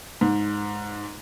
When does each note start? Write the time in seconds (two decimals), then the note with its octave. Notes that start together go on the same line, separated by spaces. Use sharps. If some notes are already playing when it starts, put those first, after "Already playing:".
0.21 G#2